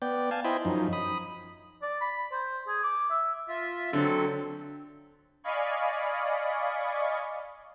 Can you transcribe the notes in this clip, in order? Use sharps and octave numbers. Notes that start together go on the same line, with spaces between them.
B3 D5 G5
F5 G#5 A5
E4 C5 D#5 G5 G#5 B5
F#2 F3 D#4
B5 D#6
D5
B5
C5
G#4
D6
E5
F4 E5
D3 F#3 C4 A4
D5 D#5 F5 G#5 B5 C#6